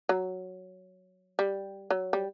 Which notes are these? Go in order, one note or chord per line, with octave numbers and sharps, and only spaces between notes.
F#3
G3
F#3
G3